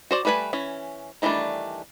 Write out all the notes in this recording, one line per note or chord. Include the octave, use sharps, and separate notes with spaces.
F#4 C5 D5
G3 A3 B4 G#5 B5
E3 C#4
D#3 E3 G3 A3 D4